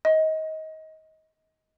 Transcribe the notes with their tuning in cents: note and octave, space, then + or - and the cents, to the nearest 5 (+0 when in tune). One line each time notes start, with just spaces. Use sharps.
D#5 +25